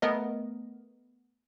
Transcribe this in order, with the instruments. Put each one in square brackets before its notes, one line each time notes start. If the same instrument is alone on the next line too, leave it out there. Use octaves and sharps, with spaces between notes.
[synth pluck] A3 B3 A#4 D#5